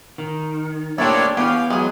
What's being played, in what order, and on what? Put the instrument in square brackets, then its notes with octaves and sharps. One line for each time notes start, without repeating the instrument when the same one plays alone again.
[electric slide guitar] D#3
[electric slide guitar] A3 A#3 G4 [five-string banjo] C4 E4 [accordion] D4 C#5 D5
[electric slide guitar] E3 B3 [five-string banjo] C#4 G4 [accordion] F5
[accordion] F#3 [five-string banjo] G#3 G#4